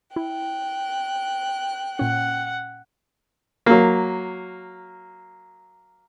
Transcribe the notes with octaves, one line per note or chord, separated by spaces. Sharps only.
E4 G5 F#6
A#2 C#4 F#5
F#3 A#3